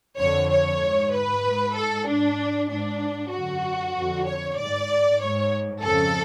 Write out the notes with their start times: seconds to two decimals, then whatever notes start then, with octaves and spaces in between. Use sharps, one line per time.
0.19 F2 D3 C#5
0.51 C#5
0.82 G#2
1.13 B4
1.44 G#2
1.76 A4
2.07 G#2 D4
2.70 G#2 D4
3.33 F#2 D3 F#4
3.96 F2 D3
4.27 C#5
4.58 G#2 D5
5.21 G#2 C#5
5.84 F2 C#3 A4